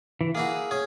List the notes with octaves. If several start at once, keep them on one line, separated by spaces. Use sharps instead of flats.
E3
A#3 E4 F#4 G#4
C#4 G#4